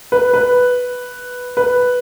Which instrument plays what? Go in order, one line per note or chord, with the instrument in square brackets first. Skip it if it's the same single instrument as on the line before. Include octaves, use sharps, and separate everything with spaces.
[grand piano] B4
B4
B4